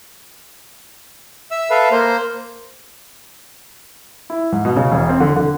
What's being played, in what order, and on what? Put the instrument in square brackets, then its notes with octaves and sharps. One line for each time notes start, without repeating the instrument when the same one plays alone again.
[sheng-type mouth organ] E5 E6
A4 B4 E5 F5
A#3 C5
[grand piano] E4
G#2
B2
C#3
E1
C4
D3
D3